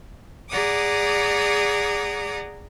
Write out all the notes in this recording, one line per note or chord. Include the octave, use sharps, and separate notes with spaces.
G#4 D5 F#5 A#5 D6 D#6